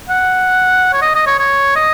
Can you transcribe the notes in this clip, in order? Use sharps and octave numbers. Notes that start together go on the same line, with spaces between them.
F#5
C#5
D#5
D#5
C#5
C#5
D#5